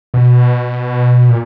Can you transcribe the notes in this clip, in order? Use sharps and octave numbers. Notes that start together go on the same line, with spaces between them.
B2
A#2